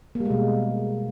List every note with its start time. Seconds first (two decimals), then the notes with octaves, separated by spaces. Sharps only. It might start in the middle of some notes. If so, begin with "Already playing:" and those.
0.15 A#3
0.20 G3
0.25 G#3
0.30 B2